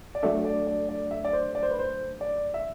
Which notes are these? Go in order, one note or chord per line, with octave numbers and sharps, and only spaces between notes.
D5
F#3 A3 D4 A4 E5
D5
D5
D5
E5
D5
C5
D5
C5
B4
C5
D5
E5